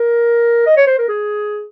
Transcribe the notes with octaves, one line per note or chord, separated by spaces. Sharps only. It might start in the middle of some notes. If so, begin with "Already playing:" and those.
Already playing: A#4
D#5
C#5
C5
A#4
G#4